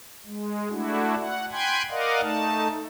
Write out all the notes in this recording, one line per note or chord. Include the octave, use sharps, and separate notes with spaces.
G#3
A3 D4 E4 F#4
F#5
G5 G#5 B5 C6 F#6 G#6
A#4 D5 D#5 F5 F#5
A3 D#4 A5